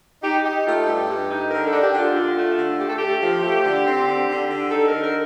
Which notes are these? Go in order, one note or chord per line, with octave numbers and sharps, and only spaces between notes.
D#4 G4
D#4 G4
A3 F4
G2 G4
G2
D#4
D3 A#4
A4
D4
G4
D3
F4
D3
A3
D3
A3 G4
A4
A3 G4
F3
A3 G4
D3
C4
D3
D3
D3
D#4 A4
D3 A#4
A#4